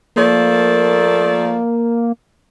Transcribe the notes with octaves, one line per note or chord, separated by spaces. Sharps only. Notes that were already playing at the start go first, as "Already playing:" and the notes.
F3 A3 A#3 D5